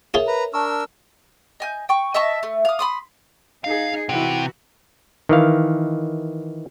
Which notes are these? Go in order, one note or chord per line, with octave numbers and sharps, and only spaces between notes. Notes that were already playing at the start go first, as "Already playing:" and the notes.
F4 G#4 A#4 C#5 E5 C6
B4 A#5
D4 A#4 A5 C#6 E6
D#5 G#5 G6
G5 C#6
D#5 E5 A5 C#6
A3
F5 D#6
B5 C6 D#6
D#4 G#4 F5
C3 E3 E4 F#4 F#5
D#3 E3 F5